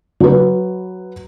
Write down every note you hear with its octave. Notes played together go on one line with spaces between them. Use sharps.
F#3 B4